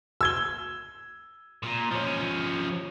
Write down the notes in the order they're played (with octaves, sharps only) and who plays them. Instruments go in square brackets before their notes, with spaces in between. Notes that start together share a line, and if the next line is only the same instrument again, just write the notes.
[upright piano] E6 G#6 G7
[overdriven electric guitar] A#2
F3 C#4